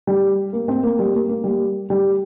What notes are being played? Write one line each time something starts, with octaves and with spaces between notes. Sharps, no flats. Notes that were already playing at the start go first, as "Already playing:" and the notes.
G3
A#3
C4
A#3
G3
A#3
A#3
G3
G3